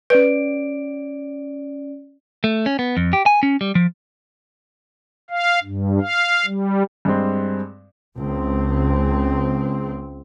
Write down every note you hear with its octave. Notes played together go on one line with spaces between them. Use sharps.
C#4 B4 D5 D7
A3
C#4
B3
F2
G4
G#5
C#4
G3
F3
F5
G2
F5
G3
G2 G#3 C4
C#2 C4